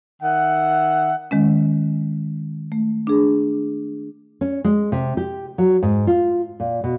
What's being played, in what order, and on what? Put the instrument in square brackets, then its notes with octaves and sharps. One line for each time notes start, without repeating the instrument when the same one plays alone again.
[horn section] D#3 E5 F#5
[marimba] D#3 G#3 C#4
A3
D4 G#4
[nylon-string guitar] C#4
G#3
C3
G4
F#3
G#2
F4
A#2
B2